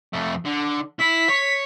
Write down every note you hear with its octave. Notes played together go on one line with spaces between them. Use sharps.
F2 A3
D3
E4 B6
C#5